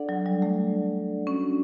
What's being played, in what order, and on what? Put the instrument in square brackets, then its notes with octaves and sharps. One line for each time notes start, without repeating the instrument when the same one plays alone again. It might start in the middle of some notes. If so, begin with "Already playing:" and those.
Already playing: [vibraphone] D4 A4 D5 F#5
[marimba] F#3
G3
A3
[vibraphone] A3 D4 F#4 [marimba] C#4